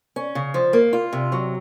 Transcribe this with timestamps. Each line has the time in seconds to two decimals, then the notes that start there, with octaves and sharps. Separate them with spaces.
0.16 C#4
0.35 C#3
0.54 F3
0.73 A#3
0.93 F4
1.13 C3
1.32 F#3